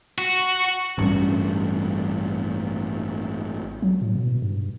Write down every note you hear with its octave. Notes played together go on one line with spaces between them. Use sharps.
F#4
A1 G2 G3 C#4
F#3
A2
B2
G2